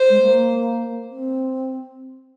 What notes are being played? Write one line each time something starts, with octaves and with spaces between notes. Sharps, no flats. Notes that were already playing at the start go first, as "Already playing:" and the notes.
Already playing: C5
G#3
A#3
C4